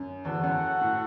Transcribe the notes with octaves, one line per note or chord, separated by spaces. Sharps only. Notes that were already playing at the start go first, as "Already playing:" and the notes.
Already playing: F#2
E2 F#4 A4 F#5
F#2
A2